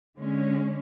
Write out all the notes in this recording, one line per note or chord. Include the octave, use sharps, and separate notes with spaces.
D3 G#3 C#4